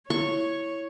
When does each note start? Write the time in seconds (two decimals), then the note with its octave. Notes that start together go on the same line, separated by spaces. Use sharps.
0.10 E4 C#5 C#6